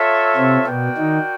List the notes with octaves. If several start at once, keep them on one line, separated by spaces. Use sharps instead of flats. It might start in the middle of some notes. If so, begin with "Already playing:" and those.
Already playing: F4 A4 C#5 E5
C3 C4
B2 B3 F#4 A#4 D5 G5
D#3 D#4